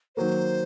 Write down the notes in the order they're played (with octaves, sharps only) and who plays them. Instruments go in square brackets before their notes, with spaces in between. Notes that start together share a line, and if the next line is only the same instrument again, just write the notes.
[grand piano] D#3 F#3 A#3 [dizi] C5